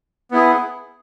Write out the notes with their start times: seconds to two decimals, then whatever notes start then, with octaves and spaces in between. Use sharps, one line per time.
0.31 B3 E4 G#4